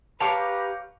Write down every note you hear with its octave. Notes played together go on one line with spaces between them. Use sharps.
G4 B4 C#5 F5 G5 A5 A#5 D6